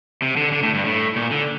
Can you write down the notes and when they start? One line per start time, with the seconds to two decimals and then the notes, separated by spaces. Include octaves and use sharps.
0.22 C3
0.37 D3
0.52 D3
0.63 A2
0.74 G2
0.85 A2
1.16 A#2
1.31 D3